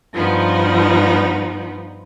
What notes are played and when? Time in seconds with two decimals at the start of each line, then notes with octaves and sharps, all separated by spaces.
0.13 G2 F3 B3 D#4